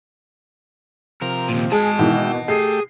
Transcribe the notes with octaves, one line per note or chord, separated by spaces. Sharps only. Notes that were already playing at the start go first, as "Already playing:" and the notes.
C3 F3 A#4
D#2 A#2
G#3 G#4 D#5 A5
B2 D#3 E3 E5 G5
A3 G4 G#4 C7